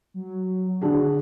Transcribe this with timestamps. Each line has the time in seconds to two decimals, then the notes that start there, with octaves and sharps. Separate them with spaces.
0.14 F#3
0.81 D3 D4 F#4 G#4